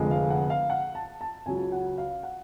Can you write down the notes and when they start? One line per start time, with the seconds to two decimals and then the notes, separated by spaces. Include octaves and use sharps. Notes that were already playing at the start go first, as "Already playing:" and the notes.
Already playing: F1 F2 D3 F3 G#3
0.11 F5
0.30 F#5
0.50 F5
0.70 F#5
0.95 A5
1.21 A5
1.46 C#2 C#3 F#3 G#5
1.72 F#5
1.98 F5
2.23 F#5